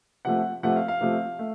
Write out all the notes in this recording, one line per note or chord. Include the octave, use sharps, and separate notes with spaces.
C3 F3 A3 F#5
C3 F3 A3 F#5
F5
F5
C3 F3 A3
A3